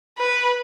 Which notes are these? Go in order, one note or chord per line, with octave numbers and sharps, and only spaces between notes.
B4